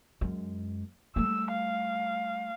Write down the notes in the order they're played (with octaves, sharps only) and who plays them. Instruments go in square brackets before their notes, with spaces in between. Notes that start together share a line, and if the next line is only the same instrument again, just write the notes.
[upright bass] F#2 G#3
[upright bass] G3 A3 [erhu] E6
[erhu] F5